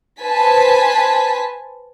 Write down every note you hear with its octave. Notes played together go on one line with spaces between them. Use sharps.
B4 C5 G#5 A5 B6